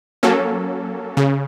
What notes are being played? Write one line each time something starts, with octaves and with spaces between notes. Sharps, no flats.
F#3 A#3 C#4 A4
C#3